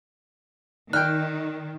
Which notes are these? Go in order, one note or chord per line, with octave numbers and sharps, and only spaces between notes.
D#3 D#4 D5 G5 F6 F#6